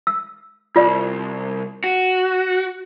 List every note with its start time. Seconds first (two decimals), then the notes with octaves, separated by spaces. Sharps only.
0.07 E6
0.76 C2 F4 D5
1.84 F#4